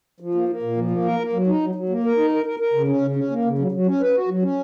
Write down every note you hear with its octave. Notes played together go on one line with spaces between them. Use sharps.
F3
A#3
A#3
A#2
F3
A#3
A#4
A#3
F#3
D#4
F#3
F#3
A#3
A#4
D#4
A#4
A#4
A#4
C#3
C#4
C#3
C#4
A#3
C#3
F#3
F#3
C#4
B4
F#4
F#3
C#4